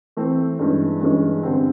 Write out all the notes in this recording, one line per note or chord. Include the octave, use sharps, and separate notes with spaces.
E3 A3 C4
G2 E3 G#3 C#4
G2 E3 G#3 C#4
G2 D3 G3 C4